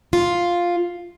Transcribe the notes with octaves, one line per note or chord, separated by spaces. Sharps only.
F4